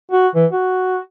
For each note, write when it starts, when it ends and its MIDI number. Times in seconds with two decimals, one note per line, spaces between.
0.12 0.28 66
0.35 0.46 52
0.52 1.00 66